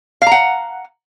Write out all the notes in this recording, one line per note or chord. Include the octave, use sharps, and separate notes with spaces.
F5 F#5 A#5